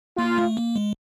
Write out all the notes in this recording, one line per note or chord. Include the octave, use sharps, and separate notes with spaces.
A#3 F4
A3
A#3
G#3